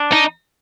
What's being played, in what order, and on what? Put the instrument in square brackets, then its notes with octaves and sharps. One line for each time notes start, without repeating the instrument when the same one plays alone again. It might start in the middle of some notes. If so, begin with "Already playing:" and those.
Already playing: [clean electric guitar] D4
[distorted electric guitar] D#4